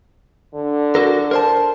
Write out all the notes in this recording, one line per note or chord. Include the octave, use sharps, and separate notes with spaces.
D3
F#4 A4 A#4
A#4 C5 A5